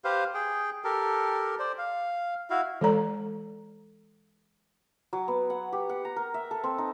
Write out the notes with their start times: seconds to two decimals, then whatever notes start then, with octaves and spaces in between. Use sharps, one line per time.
0.04 G4 B4 C5 F5
0.34 G#4 G5
0.84 G4 A4 A#4
1.59 C5 D5
1.78 F5
2.50 E4 F#4 F5
2.81 E3 G#3 A4 D5 A#5
5.13 F#3
5.28 B3
5.50 F#5
5.73 G4
5.89 F#5
6.05 A#5
6.16 A#4
6.34 E5
6.51 A4
6.64 C4
6.78 D#4